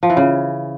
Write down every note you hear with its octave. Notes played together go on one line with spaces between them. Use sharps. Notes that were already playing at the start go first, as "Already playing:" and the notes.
F3
E3
C#3